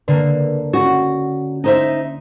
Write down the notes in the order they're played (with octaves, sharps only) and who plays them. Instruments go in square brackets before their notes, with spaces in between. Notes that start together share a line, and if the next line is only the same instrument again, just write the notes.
[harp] D3 A#3 [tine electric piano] B4
[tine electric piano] C#4 [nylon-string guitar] F#4
[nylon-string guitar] D#4 C5 E5